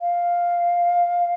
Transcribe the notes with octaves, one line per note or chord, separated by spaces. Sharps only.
F5